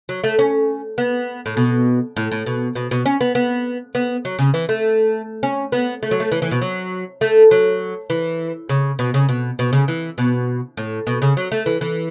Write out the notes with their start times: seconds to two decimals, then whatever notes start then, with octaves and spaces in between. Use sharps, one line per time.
0.09 F#3
0.24 A3
0.39 C#4
0.98 B3
1.46 A2
1.57 B2
2.16 A2
2.32 A2
2.46 B2
2.75 B2
2.91 B2
3.06 C#4
3.21 B3
3.35 B3
3.95 B3
4.25 F#3
4.39 C#3
4.54 E3
4.69 A3
5.43 C#4
5.72 B3
6.03 A3
6.11 F#3
6.20 A3
6.32 E3
6.42 E3
6.51 B2
6.62 F#3
7.21 A3
7.51 F#3
8.10 E3
8.69 C#3
8.99 B2
9.14 C#3
9.29 B2
9.59 B2
9.73 C#3
9.88 E3
10.18 B2
10.77 A2
11.07 B2
11.22 C#3
11.37 F#3
11.52 A3
11.66 E3
11.81 E3